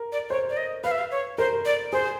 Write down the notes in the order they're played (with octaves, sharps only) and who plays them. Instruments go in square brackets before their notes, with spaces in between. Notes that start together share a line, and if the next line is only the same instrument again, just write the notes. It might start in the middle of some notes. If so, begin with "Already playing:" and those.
Already playing: [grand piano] A#4
[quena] D5
[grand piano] C5 [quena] C#5
[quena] D5
D#5
[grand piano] B4 [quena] F5
[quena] E5
F5
C#5
[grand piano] A#4 [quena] C5
[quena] D5
[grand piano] G#4 [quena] C5